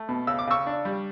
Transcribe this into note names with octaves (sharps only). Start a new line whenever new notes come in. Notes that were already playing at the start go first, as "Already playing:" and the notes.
Already playing: A3
B2
C#3 E6
D6
C#3 C#6 E6
D4
G3